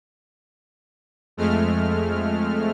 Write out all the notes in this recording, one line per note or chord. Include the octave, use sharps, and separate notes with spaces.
F2 G#3 A3 F6